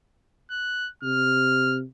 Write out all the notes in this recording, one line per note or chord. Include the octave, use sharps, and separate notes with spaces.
F#6
C3 F6